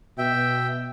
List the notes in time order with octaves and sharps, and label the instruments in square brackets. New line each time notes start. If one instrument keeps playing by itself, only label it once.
[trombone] B2 [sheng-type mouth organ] E5 G5